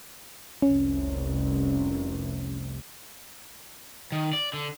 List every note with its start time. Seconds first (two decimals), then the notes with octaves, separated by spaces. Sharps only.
0.62 F1 C2 C3 C#4
4.12 D#3
4.33 D5
4.53 D3